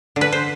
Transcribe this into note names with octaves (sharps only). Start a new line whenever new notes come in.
D3
B4
C5